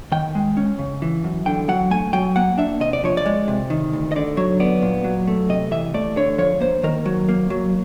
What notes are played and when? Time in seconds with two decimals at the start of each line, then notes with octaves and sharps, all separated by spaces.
0.12 D#3 G5
0.35 G#3
0.57 C#4
0.79 C#3
1.02 E3
1.24 F#2
1.46 D3 G5
1.68 F#3 F#5
1.91 A3 G#5
2.13 F#3 G5
2.36 A#3 F#5
2.58 D4 E5
2.80 C3 D#5
2.93 D5
3.04 F3 C#5
3.17 D5
3.26 G#3
3.48 C3
3.70 D#3
3.93 D2
4.12 D#5
4.16 D3 D5
4.37 F#3 C#5
4.60 B3 D5
4.82 A#2
5.04 F#3
5.27 A3
5.49 C3 D#5
5.71 E3 E5
5.94 A3 D5
6.17 D3 C#5
6.38 F3 C#5
6.61 A#3 C5
6.83 D#3 A#4
7.06 F#3
7.29 A#3
7.50 F#3